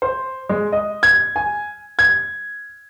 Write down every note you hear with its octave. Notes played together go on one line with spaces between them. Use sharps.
C5
G#3
D#5
G#6
G#5
G#6